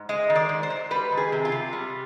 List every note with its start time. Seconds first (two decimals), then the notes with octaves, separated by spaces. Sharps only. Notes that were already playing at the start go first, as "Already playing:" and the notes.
Already playing: G#2
0.09 G#3 D#5
0.30 D#3
0.35 D5
0.49 G#2
0.63 C5
0.70 G#2
0.91 G3 B4
1.12 D#3
1.17 G#4
1.32 C3
1.45 F4
1.52 C3
1.73 G3